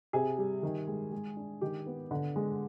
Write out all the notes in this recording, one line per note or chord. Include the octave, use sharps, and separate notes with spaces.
C3 G#4
G3
D#3
G#3
G#3
D4
D#3 G4
B3
D3
G#3